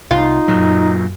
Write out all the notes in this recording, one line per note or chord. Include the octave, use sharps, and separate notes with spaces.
C2 D#4 F4
F#2 A#2 F#3